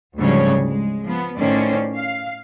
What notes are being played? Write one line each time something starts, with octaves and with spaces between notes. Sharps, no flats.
D2 G#2 C#3 F3 G3 C#5
G#3
F3 B3
A2 D#3 C#4 C5 D5
F5